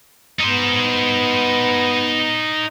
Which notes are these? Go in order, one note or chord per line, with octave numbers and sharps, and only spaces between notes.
B3 D#4 C5